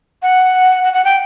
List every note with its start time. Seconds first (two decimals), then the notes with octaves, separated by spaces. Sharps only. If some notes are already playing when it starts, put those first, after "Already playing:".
0.23 F#5
0.83 F#5
0.93 F#5
1.05 G5